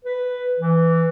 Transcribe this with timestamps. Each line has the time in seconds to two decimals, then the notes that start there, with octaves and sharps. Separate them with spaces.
0.05 B4
0.59 E3